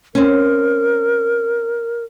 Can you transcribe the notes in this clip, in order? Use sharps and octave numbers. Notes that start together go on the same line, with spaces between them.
C4 C#4 A#4